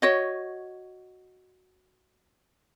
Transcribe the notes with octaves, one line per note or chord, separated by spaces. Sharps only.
F#4 C#5 D#5